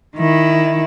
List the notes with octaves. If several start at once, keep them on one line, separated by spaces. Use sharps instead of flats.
D#3 E4